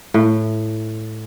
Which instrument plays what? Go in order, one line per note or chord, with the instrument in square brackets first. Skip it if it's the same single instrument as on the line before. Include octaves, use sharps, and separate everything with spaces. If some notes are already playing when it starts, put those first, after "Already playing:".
[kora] A2